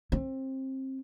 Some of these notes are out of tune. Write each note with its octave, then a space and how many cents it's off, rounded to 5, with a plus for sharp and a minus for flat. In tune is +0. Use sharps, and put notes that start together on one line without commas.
C4 +25